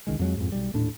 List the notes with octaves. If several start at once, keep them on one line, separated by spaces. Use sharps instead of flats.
C#2 D#3 G#3
F2 F#3 G#3
F2 G#2
B1 G3
D#1 A2 D4